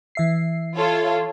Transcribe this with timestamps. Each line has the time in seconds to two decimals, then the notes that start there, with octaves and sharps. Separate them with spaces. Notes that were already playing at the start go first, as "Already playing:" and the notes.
0.15 E3 E5 C7
0.76 F4 A4 C#5